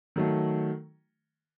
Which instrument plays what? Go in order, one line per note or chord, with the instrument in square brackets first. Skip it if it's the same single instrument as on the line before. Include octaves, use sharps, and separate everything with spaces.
[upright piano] D#3 F#3 A3